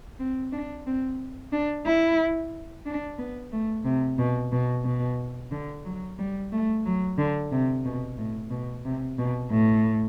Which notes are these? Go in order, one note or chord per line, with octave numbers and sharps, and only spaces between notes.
C4
D4
C4
D4
E4
D4
B3
A3
C3
B2
B2
B2
D3
F#3
G3
A3
F#3
D3
C3
B2
A2
B2
C3
B2
A2